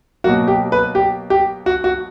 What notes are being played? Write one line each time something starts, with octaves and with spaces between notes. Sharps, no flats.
B2 F#3 A#3 F#4
G4
B4
G4
G4
F#4
F#4